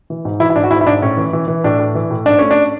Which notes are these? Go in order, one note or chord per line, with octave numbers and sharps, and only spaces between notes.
E3
G#2
E3 E4
E4
G#2 D4
F#4
G#2 E4
E4
G#2 D4
A2 C#4
E3
E3
E3
A2 D4
A2
E3
A2
G#2 D4
A3 C#4
D4